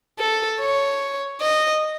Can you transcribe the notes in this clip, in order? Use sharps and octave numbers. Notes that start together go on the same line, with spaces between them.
A4
C#5
D#5